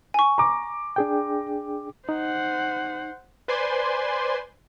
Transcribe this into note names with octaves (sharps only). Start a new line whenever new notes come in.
G#5 C#6
A#5 D6
D4 G#4 G5
D#4 C5 F#5
B4 C5 D5 G#5 C6